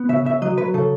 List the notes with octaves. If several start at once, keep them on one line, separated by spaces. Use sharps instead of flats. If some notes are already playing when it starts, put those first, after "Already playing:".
Already playing: B3
C#3 E5
C#3 E5
F#3 D#5
F#3 B4
C#3 A4